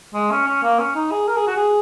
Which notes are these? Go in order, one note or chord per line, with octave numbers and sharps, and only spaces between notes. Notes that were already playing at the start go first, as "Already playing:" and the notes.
G#3
C#4
C#4
A#3
C#4
D#4
G#4
A#4
G#4
F#4
G#4